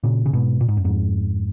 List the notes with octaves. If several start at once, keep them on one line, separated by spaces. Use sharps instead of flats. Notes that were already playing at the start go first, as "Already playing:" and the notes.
A#2 C#3
C#3
G#2 B2
A#2
G#2
F#2
F2 G#2